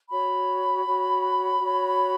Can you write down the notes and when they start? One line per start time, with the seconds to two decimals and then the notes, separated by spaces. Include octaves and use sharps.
0.10 F#4 C#5 B5
0.85 F#4 C#5
1.61 F#4 C#5